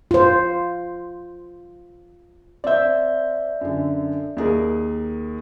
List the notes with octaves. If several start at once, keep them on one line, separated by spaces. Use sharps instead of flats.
F4 C5
C4 D5 E5 G6
F#2 D3
D#2 G#4 A#4